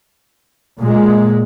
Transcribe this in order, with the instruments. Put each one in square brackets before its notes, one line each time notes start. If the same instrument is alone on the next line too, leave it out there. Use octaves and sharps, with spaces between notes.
[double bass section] A#2 G#3